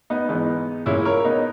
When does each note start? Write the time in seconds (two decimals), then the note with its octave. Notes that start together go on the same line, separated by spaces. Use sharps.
0.10 B3 D#4
0.29 G#2 E3 G#3 B3 D#4
0.86 A#2 G#3 C#4 E4
1.05 A#4 C#5
1.25 B3 D#4